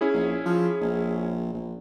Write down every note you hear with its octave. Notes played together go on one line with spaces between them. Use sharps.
C#4 E4 G#4
A#1
F3
A#1
A#1